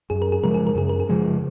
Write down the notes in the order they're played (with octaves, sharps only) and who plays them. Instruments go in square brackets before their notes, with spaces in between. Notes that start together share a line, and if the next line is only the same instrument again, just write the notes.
[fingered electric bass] F#2 [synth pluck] G#4
[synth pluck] A#4
G#4
[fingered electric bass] C#3 F3 G#3 [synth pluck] A#4
[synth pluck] G#4
A#4
[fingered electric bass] F#2 [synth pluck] G#4
[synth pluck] A#4
G#4
[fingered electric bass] C#3 F3 G#3